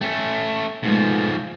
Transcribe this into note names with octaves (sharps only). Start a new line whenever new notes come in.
A3 C#4 A4 G5
G#2 B2 F3 G#3 A3